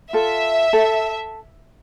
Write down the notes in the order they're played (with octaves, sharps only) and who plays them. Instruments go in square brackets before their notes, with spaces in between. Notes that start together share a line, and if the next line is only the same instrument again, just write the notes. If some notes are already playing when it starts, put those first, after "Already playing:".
[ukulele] F4 A4 [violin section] E5
[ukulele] A4